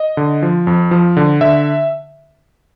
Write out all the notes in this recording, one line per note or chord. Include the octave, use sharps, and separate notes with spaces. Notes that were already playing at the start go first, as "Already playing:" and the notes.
Already playing: D#5
D3
F3
F2
F3
D3
D3 E5